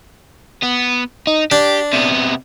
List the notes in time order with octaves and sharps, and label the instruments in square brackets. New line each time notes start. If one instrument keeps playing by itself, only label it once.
[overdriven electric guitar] B3
D#4
[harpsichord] D4 [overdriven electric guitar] G4
[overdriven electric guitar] C3 B3